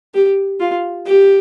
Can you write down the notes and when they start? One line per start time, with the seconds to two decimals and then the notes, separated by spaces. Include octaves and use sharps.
0.14 G4
0.60 F4
1.06 G4